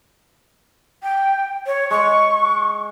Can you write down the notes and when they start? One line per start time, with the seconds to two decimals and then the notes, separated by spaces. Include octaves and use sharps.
1.03 G5
1.67 C#5
1.91 G#3 C#6